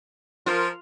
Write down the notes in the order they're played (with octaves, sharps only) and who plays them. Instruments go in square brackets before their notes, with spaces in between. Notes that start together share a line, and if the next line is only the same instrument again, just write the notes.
[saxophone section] F3 A#4 [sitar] F4